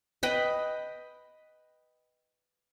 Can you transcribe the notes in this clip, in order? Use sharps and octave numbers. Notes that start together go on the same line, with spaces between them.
B4 D#5 G5 B5